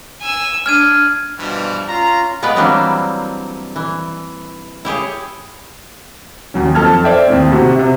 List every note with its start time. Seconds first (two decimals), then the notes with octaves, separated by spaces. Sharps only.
0.21 G#5 E6
0.66 D4 F6 G#6 D#7
1.38 G2 B2 E3 F3 G3
1.88 C#4 F4 A#5
2.42 G#3 B3 F4 B4 D5
2.56 E3 F#3 G3 A#3 C4 D4
3.76 E3
4.85 E4 G4 G#4 C#5
6.54 D#2 F#3 C#4
6.75 F2 A4 A5 F6 G#6
7.04 C5 D5 E5 G5
7.28 D#2 A2 C4
7.52 C3 F#4
7.76 C3 E5